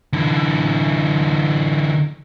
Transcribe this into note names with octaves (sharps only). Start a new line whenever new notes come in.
D3 E3